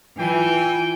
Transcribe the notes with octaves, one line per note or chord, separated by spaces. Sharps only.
E3 F4 G5 G#5